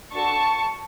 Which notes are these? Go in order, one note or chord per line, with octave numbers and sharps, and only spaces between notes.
D4 F#4 A4 A5 C#6